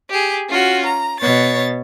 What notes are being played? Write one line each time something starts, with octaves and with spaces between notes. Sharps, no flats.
G4 G#4
C#4 F4 F#4
A#5
B2 C#5 A6